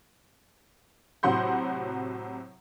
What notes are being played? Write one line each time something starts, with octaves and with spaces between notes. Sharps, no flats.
A2 C3 F#3 F#5 C6 G6